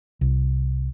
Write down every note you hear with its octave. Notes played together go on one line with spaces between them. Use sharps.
C2